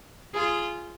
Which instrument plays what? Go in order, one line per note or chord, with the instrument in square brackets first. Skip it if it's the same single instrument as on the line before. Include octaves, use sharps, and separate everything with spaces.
[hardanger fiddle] F4 [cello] G#4